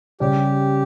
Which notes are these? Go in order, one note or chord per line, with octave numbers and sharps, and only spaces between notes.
C#3 G3 C#4 G4